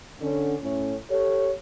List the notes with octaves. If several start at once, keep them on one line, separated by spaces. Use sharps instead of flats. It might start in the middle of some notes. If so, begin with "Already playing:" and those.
D3 C#4
A2 C#4
G4 A4 C#5